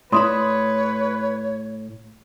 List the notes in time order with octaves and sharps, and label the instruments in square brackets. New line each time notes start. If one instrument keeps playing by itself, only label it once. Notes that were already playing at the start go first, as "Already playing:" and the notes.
[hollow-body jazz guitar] A2 E4 B5 [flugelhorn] B4 [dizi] C#5 [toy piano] D5 C6 D#6